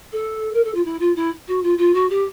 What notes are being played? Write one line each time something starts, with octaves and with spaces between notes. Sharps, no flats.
A4
A#4
A4
F4
E4
F4
E4
F#4
F4
F4
F#4
G4